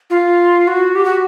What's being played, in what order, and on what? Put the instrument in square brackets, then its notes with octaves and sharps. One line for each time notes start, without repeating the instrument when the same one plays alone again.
[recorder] F4
F#4
G4
F#4